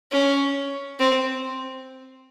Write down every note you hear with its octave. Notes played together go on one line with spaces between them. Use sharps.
C#4
C4